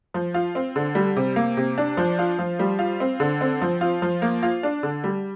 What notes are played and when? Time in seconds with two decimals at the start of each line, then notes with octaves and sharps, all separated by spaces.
0.14 F3
0.34 F4
0.55 C4
0.76 D3
0.95 G3
1.16 C3
1.36 A#3
1.57 C3
1.78 D4
1.97 F3
2.19 F4
2.39 F3
2.59 G3
2.79 F4
3.00 C4
3.20 D3
3.41 C4
3.62 F3
3.81 F4
4.02 F3
4.22 A#3
4.43 F4
4.63 D4
4.83 D3
5.04 G3